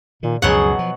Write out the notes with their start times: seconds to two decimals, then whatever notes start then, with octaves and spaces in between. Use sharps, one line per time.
0.23 A#2 D#3
0.42 C#2 F#2 B2 F3 F#3 G#4 F#5
0.79 F3